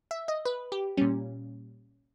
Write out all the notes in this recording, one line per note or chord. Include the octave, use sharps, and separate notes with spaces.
E5
D#5
B4
G4
A#2 G3 C#4